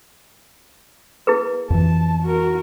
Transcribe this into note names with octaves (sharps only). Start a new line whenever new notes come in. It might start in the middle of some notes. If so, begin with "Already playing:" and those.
A#3 E4 G#4 B4
F2 E3 A5
F#4 A#4